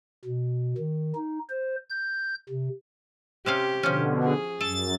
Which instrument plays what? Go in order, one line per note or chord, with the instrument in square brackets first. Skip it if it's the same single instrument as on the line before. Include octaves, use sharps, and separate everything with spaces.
[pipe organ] B2
D#3
D#4
C5
G6
C3
[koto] C3 C#4 F5 [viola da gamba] G4
[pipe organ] B2 D3 [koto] F3 C#4
[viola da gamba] G#4
[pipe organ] F#2 A6 [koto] A4